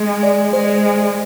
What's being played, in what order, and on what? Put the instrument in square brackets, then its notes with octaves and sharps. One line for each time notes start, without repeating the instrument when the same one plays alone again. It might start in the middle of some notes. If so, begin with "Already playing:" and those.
Already playing: [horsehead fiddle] G#3
[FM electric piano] D5
[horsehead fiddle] G#3 [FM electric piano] C5